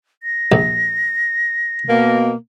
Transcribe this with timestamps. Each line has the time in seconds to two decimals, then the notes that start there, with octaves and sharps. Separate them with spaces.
0.23 A#6
0.52 A#1
1.89 B2 A#3